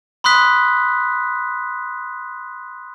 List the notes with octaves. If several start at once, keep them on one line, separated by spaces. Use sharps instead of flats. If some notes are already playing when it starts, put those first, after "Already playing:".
B5 C6 D#6 F#6 B6